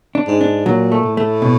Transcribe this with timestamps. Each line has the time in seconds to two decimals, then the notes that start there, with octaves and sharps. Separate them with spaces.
0.15 D4
0.27 G#2
0.41 D4
0.66 A#2 F#3
0.92 A3
1.04 A2
1.17 A3
1.42 B2